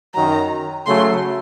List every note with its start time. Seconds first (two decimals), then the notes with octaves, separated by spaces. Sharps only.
0.14 F#2 D#3 F#3 A#5
0.86 C#3 F#3 A3 C6